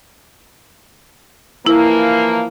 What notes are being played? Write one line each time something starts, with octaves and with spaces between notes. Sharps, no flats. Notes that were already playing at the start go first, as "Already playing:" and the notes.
E3 F3 A#3 E4